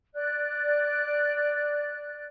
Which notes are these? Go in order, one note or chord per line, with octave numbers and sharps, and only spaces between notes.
D5 F#6